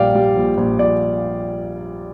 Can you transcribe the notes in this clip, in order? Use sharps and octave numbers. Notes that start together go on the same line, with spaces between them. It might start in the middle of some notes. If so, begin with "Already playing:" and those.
Already playing: A#1 A#2 G3 D5 F5 G5
G3
A#1
A#1
A#1 D5